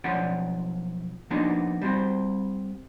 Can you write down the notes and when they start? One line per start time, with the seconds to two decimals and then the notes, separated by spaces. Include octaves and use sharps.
0.04 B1 F3 C#4 D5 F#5
1.30 F3 A#3 B3 D4 D#4 F#4
1.82 G3 C4 F#4 C5